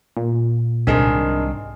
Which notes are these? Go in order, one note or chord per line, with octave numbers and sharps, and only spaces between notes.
A#2
C2 G#2 C3 D#3 G#3 C4 D4 A#4